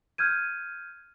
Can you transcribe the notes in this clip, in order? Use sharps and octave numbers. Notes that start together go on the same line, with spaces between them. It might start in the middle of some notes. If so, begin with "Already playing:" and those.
F6 G6 G#6 D#7